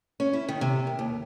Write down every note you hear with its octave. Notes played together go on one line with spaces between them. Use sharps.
C#4
E4
D#3
C3
A#4
D#2